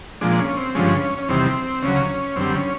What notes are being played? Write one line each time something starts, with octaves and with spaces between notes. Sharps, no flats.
A#2 F3 G#3 D4
D4
C#4
C4
G2 D3 F3 G#3 C#4
C#4
E2 C3 D#3 G3 C4
D2 C#3 F#3 C#4
F#2 D3 G3 C4
C#4